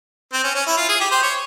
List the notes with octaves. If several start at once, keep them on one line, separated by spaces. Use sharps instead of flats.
C4
C#4
C#4
E4
F4
G#4
G4
C5
C#5